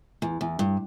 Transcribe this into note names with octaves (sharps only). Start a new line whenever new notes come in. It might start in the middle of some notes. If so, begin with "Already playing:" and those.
E2
E2
G2